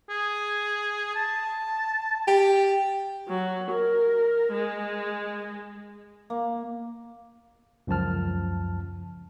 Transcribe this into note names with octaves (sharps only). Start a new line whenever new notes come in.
G#4
A5
G4
F#3
A#4
G#3
A#3
C#2 F#2 F3 A5 F6